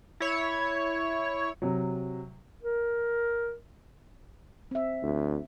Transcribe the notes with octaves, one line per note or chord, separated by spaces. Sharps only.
E4 C#5
C3 F#3
A#4
C4 E5
D2